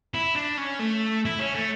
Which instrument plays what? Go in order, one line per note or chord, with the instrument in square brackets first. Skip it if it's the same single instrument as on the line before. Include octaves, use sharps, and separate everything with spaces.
[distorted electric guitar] E4
D4
C#4
A3
E4
C#4
A3